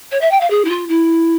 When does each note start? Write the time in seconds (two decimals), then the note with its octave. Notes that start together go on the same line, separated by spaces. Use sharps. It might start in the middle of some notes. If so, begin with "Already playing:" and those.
0.11 C#5
0.21 E5
0.31 G5
0.40 F5
0.50 G#4
0.65 E4
0.69 F4
0.88 E4